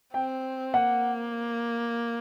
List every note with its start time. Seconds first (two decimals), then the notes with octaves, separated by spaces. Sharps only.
0.14 C4 G5
0.74 A#3 F#5